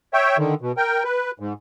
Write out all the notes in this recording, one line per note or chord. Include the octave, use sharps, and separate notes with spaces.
C#5 E5 G5
D3 D#3
B2
A#4 G5
B4
G#2